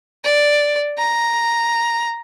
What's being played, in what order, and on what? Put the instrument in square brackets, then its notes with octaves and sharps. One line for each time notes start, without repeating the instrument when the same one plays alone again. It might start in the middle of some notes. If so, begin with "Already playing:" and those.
[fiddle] D5
A#5